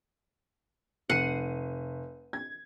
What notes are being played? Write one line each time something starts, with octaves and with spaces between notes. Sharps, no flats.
F1 F#5 C7 D#7
G#6